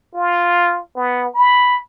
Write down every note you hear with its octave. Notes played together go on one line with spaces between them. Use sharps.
F4
B3
B5